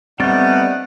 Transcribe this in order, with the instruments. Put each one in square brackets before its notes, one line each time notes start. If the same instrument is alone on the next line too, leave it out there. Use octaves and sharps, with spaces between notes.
[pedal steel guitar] G3 B3 [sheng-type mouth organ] A3 D4 D#4 [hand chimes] C4 A6 [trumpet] F#5